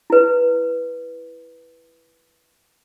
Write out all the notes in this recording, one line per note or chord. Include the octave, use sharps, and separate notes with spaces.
E4 B4